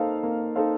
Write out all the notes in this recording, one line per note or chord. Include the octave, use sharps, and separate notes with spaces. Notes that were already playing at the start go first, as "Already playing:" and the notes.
Already playing: A#3 D#4 A4 C5 F5
A#3
D#4 A4 C5 F5